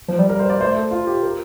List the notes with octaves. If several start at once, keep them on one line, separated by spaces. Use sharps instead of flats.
F3
G3
A#4
C5
D5
A3 C5
A4
F4
G4
A#4